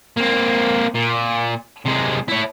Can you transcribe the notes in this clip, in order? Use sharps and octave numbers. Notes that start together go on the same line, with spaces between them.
A#3 C4
A#2
C3 G#3
E4 C#5